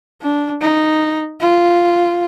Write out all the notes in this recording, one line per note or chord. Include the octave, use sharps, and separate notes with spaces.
D4
D#4
F4